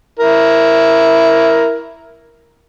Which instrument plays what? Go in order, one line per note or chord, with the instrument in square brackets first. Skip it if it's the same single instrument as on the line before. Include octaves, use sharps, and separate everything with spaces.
[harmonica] E4 A#4